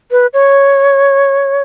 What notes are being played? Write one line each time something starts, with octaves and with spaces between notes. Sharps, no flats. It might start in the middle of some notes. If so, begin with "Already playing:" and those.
B4
C#5